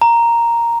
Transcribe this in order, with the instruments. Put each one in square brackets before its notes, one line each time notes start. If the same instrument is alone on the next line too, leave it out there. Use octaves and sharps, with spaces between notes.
[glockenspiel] A#5